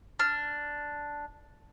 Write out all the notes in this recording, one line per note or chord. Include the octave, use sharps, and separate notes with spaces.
D4 F6